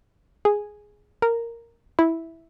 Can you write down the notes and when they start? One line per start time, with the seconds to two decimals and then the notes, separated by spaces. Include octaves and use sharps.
0.45 G#4
1.22 A#4
1.99 E4